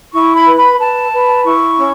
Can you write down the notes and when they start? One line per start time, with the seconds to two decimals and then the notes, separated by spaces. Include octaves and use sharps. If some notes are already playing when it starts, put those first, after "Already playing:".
0.13 E4 C#6
0.34 B5
0.45 B4
0.57 B5
0.78 B4 A5
1.11 B4
1.43 E4 C#6
1.76 C#4